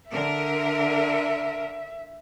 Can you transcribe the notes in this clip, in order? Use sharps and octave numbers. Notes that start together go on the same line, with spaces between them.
D3 A#4 E5